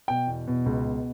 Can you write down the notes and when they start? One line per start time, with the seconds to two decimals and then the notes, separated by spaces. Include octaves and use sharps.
0.08 B2 G5
0.27 E2
0.47 B2
0.66 C#2
0.86 B2